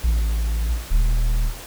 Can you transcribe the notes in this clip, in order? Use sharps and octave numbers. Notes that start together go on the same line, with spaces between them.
A1
D#1